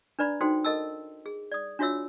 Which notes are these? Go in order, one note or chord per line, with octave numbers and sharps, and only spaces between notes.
D4 B4 D5 A#5 B5
D#4 F#4 A4 C5 G5 C6
A4 A#4 D#5 A5 E6
G#4
D5 D#6
D4 F4 F#4 C#5 E5 E6